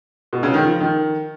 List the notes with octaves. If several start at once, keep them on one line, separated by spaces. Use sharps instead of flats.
B2
C#3
D#3
F3
D#3